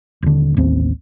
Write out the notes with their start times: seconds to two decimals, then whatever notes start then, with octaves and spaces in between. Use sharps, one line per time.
0.22 D#1 D3
0.57 A1 D#2 C4